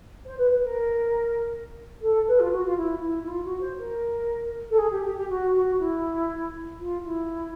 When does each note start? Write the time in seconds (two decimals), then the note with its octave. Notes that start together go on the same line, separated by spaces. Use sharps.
0.25 C5
0.38 B4
0.51 B4
0.63 A#4
2.01 A4
2.27 B4
2.39 F4
2.52 F#4
2.65 F4
2.77 E4
3.02 E4
3.23 E4
3.27 F4
3.44 F#4
3.60 C5
3.78 A#4
4.70 A4
4.78 G#4
4.90 G4
5.03 G4
5.16 G4
5.29 F#4
5.53 F#4
5.79 E4
6.80 F4
7.05 E4